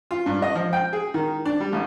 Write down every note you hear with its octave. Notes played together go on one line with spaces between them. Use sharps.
F4
G2
D#5
F3
G5
G#4
D#3
D4
G3
A1